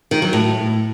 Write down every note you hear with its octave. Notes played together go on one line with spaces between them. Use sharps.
D#3
F#3
A2